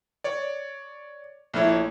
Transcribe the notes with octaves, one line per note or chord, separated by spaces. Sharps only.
C#5 D5
A#1 A3 E4 C#5